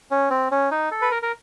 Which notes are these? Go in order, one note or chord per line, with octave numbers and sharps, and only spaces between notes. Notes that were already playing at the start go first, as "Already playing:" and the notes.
C#4
C4
C#4
D#4
A4
B4
A#4
A#4